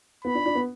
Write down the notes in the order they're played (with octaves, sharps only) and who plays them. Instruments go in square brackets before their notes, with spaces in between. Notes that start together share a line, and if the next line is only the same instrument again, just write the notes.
[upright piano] B3 [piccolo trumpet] B5
[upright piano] D4
D4
B3